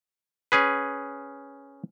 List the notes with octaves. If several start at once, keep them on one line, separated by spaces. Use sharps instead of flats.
C#4 G#4 B4